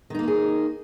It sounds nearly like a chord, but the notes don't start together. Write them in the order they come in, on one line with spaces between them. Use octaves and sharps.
D#3 D#4 A#3 F4 G#4